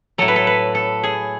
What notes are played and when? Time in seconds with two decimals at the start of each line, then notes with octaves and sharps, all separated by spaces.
0.18 A2 F#3 A4
0.28 B4
0.36 A4
0.47 B4
0.75 A4
1.03 G#4